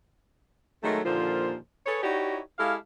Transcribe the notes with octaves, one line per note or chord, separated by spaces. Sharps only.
D#3 F#3 G#3 A3
D#2 A#2 D3 F3 F4 C5
G#4 A4 B4 C#5
D#4 E4 F#4 G4 C#5 D5
G#3 E4 G4 A4 F5